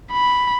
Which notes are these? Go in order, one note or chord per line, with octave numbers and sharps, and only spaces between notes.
B5